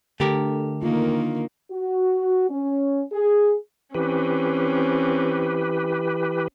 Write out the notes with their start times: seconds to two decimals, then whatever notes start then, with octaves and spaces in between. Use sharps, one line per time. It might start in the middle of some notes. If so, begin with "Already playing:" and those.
0.20 D3 A3 G4 A#4
0.82 D#3 A#3 F4
1.71 F#4
2.50 C#4
3.13 G#4
3.95 E3 C4 C#4 G4 B4